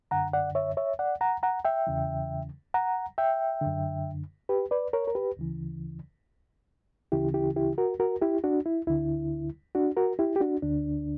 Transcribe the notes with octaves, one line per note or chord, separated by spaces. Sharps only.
F#2 D3 F#5 A#5
D5 F#5
C#5 E5
C#5 E5
D5 F#5
F#5 A#5
F#5 A#5
E5 G5
E2 C#3 E3
F#5 A#5
E5 G5
F#2 D3
G4 B4
B4 D5
A#4 C#5
A#4
G4 B4
D2 C#3 E3
D2 C#3 E3 E4 G4
E4 G4
E4 G4
F#4 A#4
F#4 A#4
E4 G4
D4 F#4
E4
D2 D3 E4
D4 F#4
F#4 A#4
E4 G4
G4
D4 F#4
D2 D3 D4